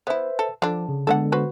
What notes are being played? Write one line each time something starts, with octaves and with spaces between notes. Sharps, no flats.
B3 E4 B4 C5 E5
A4
D3 F3 D4
C#3
D3 G#3 B3 A4 D#5 F#5
F#4 B4 C5